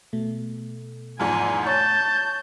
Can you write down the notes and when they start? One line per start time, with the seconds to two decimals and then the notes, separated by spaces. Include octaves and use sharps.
0.13 B2 A3
1.20 E2 G#2 F3 G#5
1.66 C#5 A5 G6 A6